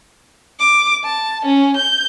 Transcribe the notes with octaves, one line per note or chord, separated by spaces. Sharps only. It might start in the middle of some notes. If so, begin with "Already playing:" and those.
D6
A5
C#4
G6